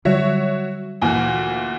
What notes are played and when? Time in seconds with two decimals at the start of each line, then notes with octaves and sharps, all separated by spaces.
0.05 D3 F#3 G3 F#4 C#5 E5
1.02 D2 A#2 E3